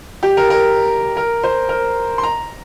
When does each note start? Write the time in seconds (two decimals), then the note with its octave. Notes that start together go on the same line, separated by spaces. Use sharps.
0.23 G4
0.37 A#4
0.50 A#4
1.17 A#4
1.43 C5
1.69 A#4
2.18 C6
2.23 A#5